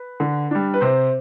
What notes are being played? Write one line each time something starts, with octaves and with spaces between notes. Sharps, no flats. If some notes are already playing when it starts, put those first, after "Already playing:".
Already playing: B4
D3
G3 D4
B4
C3 C5